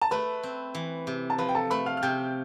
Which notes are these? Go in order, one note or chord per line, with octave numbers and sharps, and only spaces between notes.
A5
A3 B4 B5
C4
E3
C3
A5
F3 B4 B5
G5
A4 A5
A3 B4 B5
F5 F6
F6
C3 G5 G6